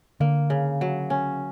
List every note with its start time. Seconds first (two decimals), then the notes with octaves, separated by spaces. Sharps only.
0.20 D3 A#3
0.50 C#3
0.81 F#3
1.10 C#4